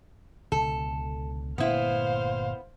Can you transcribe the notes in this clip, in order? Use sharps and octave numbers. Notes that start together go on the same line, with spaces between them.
C#2 B2 D3 A4
G1 A#2 A3 B3 E4 C5 F5